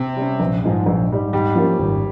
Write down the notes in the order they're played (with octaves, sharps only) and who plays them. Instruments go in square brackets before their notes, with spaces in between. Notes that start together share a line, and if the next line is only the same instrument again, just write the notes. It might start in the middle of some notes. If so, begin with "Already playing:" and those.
Already playing: [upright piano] C3
[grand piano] G3 C#4
A#1
G#2 F3 G#3 D#4
A#1
G#2 G3
[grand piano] G#2 [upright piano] G3
[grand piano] F3 A#3 C#4
G#1